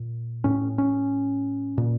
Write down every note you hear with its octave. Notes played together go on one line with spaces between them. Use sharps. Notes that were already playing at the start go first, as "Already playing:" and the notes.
Already playing: A#2
A2 C#4
C#4
A#2